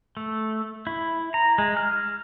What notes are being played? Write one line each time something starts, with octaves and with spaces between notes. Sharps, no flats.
A3
E4
A#5
G#3
F6